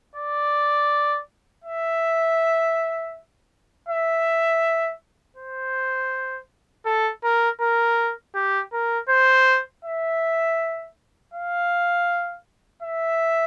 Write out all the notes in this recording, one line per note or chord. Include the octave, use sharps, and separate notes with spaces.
D5
E5
E5
C5
A4
A#4
A#4
G4
A#4
C5
E5
F5
E5